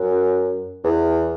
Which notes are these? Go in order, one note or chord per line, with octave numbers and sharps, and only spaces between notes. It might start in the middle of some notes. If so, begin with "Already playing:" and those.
Already playing: F#2
E2